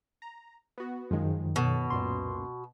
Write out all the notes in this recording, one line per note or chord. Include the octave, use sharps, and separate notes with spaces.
A#5
B3 F#4
F#2 D#3 F3 G#3
B2 A4 C#5
C#2 F#2 A#2 C6